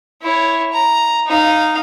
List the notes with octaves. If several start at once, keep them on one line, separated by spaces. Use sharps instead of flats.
E4 C#5
A#5
D#4 F5